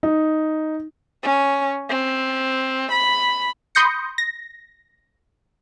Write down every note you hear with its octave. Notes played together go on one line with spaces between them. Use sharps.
D#4
C#4
C4
B5
B5 C6 D#6 G6 A#6 C#7
A#6